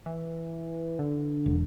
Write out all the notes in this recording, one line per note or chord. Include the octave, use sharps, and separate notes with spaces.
E3
D3
E1